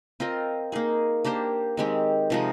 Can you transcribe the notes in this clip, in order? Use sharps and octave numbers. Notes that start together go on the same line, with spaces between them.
C4 F4 A#4 D#5
A#3 D#4 G#4
A#3 D4 G4 C5
D#3 G#3 C4 G4
C3 F3 G#3 D#4